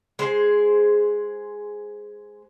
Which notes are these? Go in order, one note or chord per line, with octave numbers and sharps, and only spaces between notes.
G#3 G#4 C5